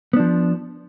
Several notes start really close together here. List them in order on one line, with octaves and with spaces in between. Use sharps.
B3 D4 F3